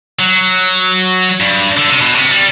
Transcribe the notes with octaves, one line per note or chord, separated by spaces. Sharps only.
F#3
G2
D3
C3
B2
C3
G3